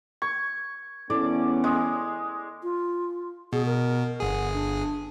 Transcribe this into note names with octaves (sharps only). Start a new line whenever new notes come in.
C#6 G#6
E2 B3 C#4 E4 A4 D5
G#3 G#5 D#6
F4
B2 G#4
A#4
G1 G#4 F#5
D4